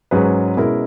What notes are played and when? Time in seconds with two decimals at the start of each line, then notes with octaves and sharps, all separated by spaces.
0.11 G#2 F#3 C#4 G#4 B4
0.57 B2 G#3 C#4 E4 A#4